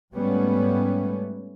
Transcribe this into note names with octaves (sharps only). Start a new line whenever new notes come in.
G#2 G3 A3 B3 C#4